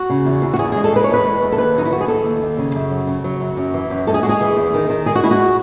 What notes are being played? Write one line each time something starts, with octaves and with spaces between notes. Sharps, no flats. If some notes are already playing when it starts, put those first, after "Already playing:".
Already playing: F#4
C#3
E2
E2
F#4
E2 G#4
G#3 G#4
A4
G#3 B4
C#5
E2 B4
G#3
E2
A4
D#2 B4
F#3 D#4
E4
D#2 F#4
G#4
D#2 A4
D#2
D#2
C#3
F#2
F#3
C#3
F#3
F#2
F#2
E3
F#2
G#3 A4
G#4
G#3 F#4
G#4
E3
E2
D#3
D#3
G#3 G#4
F#4
G#3 E4
F#4